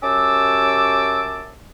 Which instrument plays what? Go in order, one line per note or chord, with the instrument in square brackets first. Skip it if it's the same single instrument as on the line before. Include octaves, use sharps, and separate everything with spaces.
[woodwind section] F#2 C#4 G4 A5 D6 E6